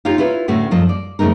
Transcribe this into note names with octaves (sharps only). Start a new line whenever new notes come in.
D#4 F4 G4 C#5 F5
E4 F4 B4 C#5
D2 A2 A3 C#4 F#4
F#2 F3 A4 D#5
D5
F2 C#3 A3 D#4 A#4